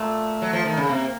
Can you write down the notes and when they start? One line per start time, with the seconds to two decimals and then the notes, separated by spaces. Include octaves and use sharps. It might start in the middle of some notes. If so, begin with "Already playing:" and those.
Already playing: A#2 A3
0.42 F#3
0.53 F3
0.65 D#3
0.77 C#3
0.89 C3 A#3